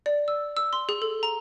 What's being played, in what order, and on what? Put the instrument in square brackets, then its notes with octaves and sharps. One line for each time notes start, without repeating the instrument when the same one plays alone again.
[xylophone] D5
E6
E6
C6
G#4
A4
A#5